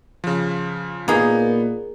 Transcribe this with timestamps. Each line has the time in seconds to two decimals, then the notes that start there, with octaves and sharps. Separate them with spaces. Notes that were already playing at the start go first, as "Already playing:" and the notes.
0.24 C#3 F3
1.08 A#2 A#3 B3 D#4 G#4